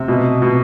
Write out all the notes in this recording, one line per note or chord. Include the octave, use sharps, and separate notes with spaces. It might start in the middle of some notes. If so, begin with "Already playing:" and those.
Already playing: C3
B2
B2